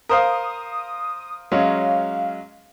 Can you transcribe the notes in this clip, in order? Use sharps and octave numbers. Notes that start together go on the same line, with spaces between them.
A#4 C5 F5 D#6
F#3 G#3 C#4 F5